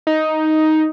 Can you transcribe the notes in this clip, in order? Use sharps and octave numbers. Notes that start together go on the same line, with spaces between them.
D#4